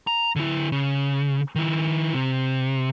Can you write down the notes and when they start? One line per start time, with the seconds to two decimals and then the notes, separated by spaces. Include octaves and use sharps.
0.07 A#5
0.36 D3 E4
0.72 C#3
1.55 D#3 E4
2.14 C3